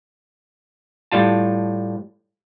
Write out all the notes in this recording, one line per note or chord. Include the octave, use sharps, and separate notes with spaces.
A2 G3 F4 A5